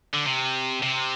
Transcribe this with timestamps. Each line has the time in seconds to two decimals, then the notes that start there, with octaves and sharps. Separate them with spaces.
0.14 D3
0.26 C3
0.83 C3